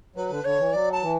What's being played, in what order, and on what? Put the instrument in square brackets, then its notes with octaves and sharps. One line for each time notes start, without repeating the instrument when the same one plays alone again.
[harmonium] F#3 [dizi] B4
[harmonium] D3
[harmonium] D3 [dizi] C#5
[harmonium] E3
[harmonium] F#3 [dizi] D5
[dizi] A5
[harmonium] E3